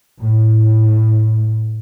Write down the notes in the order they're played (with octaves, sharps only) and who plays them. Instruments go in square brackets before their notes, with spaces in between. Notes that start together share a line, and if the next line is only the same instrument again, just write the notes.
[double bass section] A2